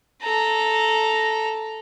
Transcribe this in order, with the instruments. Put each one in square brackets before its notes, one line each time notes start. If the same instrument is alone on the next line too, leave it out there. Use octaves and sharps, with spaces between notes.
[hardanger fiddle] A4 A#5